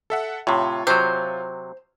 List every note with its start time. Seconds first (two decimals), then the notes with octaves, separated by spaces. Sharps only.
0.10 A4 E5 F#5
0.47 A2 C3 F4 C#5
0.87 C3 F#3 C5